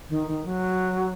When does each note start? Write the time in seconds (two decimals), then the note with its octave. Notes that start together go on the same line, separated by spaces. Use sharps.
0.09 D#3
0.27 D#3
0.45 F#3